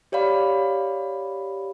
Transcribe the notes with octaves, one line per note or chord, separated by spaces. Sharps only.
G4 C#5 D5 F5 B5